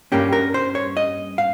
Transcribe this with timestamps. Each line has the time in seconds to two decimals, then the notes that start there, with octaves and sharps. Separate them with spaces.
0.12 G2 G3 A#3 C#4 G4
0.33 A#4
0.54 C5
0.75 C#5
0.97 D#5
1.38 F5